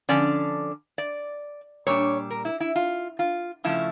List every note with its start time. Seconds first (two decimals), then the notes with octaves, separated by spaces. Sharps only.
0.09 D3 F3 C#4 D5
0.98 D5
1.87 A#2 G3 D4 C#5
2.30 A#4
2.45 E4
2.60 E4
2.76 F4
3.19 F4
3.64 C#3 F3 A3 C#4 E4